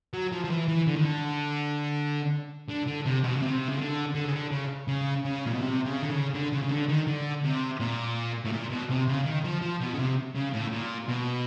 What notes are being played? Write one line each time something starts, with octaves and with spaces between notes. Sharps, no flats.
F#3
F3
F3
E3
E3
D3
D#3
D3
D3
D3
C3
B2
C#3
C3
C#3
D3
D3
C#3
D3
C#3
C#3
C#3
A#2
B2
C3
C#3
D3
C#3
D3
C#3
C#3
D3
D#3
D3
C3
A#2
A2
A#2
B2
C3
C#3
D#3
F3
F3
B2
C#3
C3
C#3
A2
A#2
B2